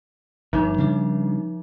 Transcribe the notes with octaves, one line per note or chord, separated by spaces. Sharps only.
G1 G2 F3 D#4
C#3 G3 D4